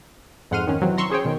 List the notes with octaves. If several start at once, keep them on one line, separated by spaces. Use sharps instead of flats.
F2 G#2 F#5 C6 F6 D#7
D#3 C#4
C3 E3 F#3 C4
A#5 C6 C#6 E6
C#4 G#4 C5 C#5 G5
B2 D#3